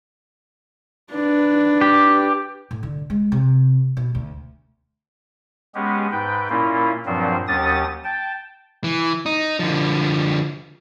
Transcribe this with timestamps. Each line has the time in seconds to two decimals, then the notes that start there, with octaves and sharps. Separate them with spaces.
1.12 D4 B4
1.81 G4
2.71 A2
2.83 D3
3.10 G#3
3.32 C3
3.97 B2
4.15 D2
5.75 G#3 B3 C#4 G4 G#4
6.12 G#2 B4 G5
6.49 A#2 A#3 C#4 E4 F4
7.06 G2 A#2 F3 F#3 C4 C5
7.48 D#2 F#3 C#4 G4 D#6 A6
8.04 G5 A5
8.84 E3
9.26 D#4
9.59 D3 F3